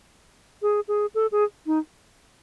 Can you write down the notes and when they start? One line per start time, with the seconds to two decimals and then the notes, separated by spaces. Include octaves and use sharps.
0.62 G#4
0.88 G#4
1.15 A4
1.32 G#4
1.67 D#4